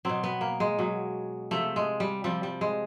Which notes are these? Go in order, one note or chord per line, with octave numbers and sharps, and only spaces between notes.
B2 F#3 C4
B3
A#3
G#3
B2 F#3
C3 F3 A3
G#3
G3
C3 F3 G3
G3
G#3